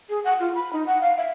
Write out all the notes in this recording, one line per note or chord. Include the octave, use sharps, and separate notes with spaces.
G#4
F#5
F4
B5
D#4
F#5
F5
E5